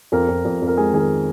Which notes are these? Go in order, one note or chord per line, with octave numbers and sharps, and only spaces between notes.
F2 A#4
F2
F2
F2
A#4
G#3 G#4
D#3 G#4 A#4